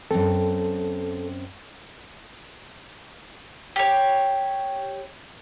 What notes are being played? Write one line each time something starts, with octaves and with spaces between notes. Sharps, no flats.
F#2 C4 A4
G4 C#5